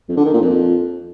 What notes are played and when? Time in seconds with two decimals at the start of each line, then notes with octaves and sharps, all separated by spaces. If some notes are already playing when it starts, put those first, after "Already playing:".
0.09 F2
0.17 D3
0.25 D#3
0.33 A#2
0.41 F2